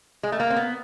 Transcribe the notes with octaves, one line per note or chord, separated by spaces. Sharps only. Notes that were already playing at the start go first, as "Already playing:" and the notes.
G#3
A3
A#3
C4
B3